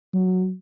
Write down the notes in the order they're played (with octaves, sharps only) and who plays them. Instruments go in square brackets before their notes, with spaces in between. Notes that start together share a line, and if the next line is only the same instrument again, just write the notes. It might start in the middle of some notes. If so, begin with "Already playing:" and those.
[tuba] F#3